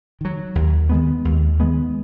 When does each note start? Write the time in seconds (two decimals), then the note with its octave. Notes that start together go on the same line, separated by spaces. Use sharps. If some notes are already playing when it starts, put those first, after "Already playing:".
0.21 D#3 F#3
0.55 D#2
0.89 D#3 G#3 B3
1.25 D#2
1.60 D#3 G#3 B3